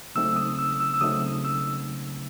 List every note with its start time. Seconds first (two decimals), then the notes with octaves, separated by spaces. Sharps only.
0.15 C#3 F#3 A3 C4 D#4 E6
0.36 D#6
0.59 E6
0.80 E6
0.94 E6
1.01 C#3 F#3 A3 C4 D#4 D#6
1.45 E6